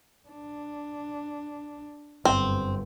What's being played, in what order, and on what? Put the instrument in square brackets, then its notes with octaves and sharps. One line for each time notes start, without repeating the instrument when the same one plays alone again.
[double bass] D4
[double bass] G1 F#2 [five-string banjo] C4